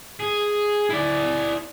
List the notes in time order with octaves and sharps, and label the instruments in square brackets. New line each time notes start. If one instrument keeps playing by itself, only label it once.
[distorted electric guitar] G#4
E4 D5